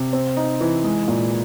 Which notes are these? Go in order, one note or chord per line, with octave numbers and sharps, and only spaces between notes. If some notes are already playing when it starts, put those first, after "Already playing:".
Already playing: C3
C4
D#4
E3
G#3
A#2